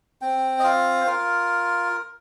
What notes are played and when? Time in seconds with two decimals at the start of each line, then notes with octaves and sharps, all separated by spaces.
0.22 C4 G5
0.59 D#5
0.64 F4 F5
1.01 C5
1.07 F4 A#4